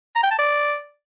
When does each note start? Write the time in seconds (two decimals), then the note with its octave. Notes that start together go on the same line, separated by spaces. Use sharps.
0.16 A#5
0.23 G5
0.31 A5
0.39 D5